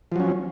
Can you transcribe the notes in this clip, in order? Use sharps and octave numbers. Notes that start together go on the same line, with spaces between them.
F3 F#3 C#4